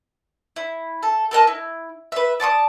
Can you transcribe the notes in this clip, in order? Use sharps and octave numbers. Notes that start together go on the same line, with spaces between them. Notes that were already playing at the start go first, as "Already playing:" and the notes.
E4
A4
A4 A#4 D#5 A5
E4
B4 E5
D5 A5 C#6 D#6